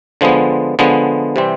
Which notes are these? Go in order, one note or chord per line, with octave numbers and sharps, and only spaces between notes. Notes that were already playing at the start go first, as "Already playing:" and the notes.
D3 F3 G#3 B3
D3 F3 G#3 B3
C3 E3 G3 C4